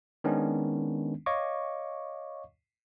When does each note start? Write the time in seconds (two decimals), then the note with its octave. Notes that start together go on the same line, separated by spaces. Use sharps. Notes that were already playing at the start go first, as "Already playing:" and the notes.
0.24 D#3 G#3 B3 C#4 D4
1.26 C#5 D#5 F5 C#6 D6